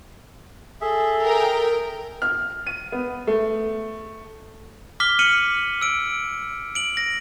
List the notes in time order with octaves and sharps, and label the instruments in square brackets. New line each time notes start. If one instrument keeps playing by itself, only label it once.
[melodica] G#4 E5 [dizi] A4
[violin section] A#4 G5
[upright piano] F6
D#7
B3
A3
[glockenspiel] D6 F6 B6 G7
F6 C#7 D#7 F#7
E6 D7
D7 F#7
A#6